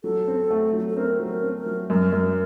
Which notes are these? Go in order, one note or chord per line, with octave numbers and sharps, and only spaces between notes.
F#3 A4
C4
A3
F#3
A4
C4 A#4
F#3
A#4
C4
A#4
F#3
F#2 A#4
F#2